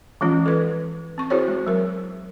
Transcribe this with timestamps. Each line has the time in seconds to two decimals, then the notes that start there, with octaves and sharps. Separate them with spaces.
0.21 E3 F3 G#3 C#4 F4
0.46 A4 B4
1.18 C4 C#6
1.30 E4 F#4 G#4 C5 C#5
1.48 G#3
1.67 F#3 A#4